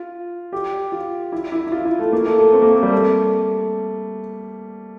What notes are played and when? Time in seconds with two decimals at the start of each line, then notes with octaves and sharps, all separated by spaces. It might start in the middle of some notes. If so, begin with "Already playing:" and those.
Already playing: F4
0.53 G4
0.92 F4
1.32 E4
1.52 E4
1.67 E4
1.72 F4
1.85 E4
1.99 A3
2.13 A#3
2.26 A3
2.39 A3
2.53 C4
2.62 A#3
2.72 A3
2.83 G3
2.92 A3